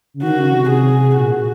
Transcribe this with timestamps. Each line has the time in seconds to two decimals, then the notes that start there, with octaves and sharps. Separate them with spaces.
0.14 C#3
0.23 D#3 F#4
0.39 C#3
0.54 C3
0.70 G#4
1.17 A#2 F#4